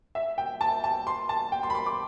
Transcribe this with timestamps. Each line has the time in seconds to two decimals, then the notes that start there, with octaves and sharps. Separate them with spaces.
0.15 E5
0.38 G5
0.61 A5
0.84 A5
1.07 C6
1.29 A5
1.52 G5
1.63 C6
1.70 B5
1.75 C6
1.86 D6